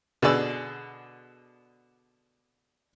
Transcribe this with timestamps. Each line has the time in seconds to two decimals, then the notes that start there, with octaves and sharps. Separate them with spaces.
0.22 B2 D3 G#4 D5 E6